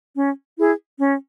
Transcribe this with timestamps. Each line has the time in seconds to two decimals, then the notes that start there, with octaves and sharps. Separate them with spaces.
0.14 C#4
0.57 E4 G#4
0.99 C#4